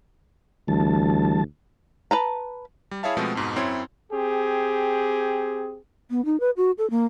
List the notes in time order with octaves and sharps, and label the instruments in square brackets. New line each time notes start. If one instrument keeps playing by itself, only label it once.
[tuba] D2 [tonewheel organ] E3 G3 A5
[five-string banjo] B4 A5 A#5
[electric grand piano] G3
E4 G#4 C#5 E5 F5 A5
B2 F3 G#3 A3 B3 C4
F2 G#2 B2
F#2 C4 E4 C#5 C6
[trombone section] C4 G4 G#4
[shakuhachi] B3
D#4
B4
F#4
A4
A#3